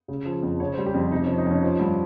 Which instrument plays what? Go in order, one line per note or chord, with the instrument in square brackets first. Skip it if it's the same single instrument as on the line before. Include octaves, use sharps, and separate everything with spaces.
[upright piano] C#3
F3
F2
C#3 C#5
C5
G3
G4
F2 F4
C3 D#4
C#4
F3
D#4
F2
C#4
F3
G2